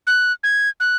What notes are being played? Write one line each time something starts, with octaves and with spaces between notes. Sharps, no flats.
F#6
G#6
F#6